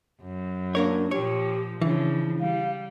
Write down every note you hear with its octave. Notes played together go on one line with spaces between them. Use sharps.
F#2
A#3 D4 A#4 C#5
A#2 F3 G4 C#5
C#3 E3 F3 D4
G3 F5